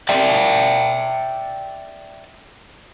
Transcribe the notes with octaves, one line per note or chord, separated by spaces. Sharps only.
D5 E5 G5